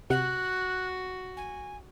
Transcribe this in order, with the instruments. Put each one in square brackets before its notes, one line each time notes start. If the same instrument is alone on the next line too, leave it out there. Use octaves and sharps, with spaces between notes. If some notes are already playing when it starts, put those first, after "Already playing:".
[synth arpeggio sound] C3 F#5 [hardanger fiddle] F#4 [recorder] F#6
[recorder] G#5